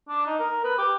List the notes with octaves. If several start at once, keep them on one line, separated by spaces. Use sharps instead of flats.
D4
D#4
A#4
B4
G4